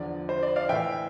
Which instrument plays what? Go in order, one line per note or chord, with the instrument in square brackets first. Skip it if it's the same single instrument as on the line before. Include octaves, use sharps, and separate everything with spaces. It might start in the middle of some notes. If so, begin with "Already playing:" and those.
Already playing: [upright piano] E2 D3 F3 D5
C5
D5
D5 F5
A2 E3 E5 G5